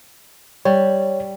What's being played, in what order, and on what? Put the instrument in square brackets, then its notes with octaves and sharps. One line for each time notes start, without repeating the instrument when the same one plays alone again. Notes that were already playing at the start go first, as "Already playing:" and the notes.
[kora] G3 [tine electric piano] C#5